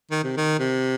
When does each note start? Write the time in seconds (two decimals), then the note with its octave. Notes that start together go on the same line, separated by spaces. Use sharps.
0.11 D#3
0.24 C3
0.37 D#3
0.59 C3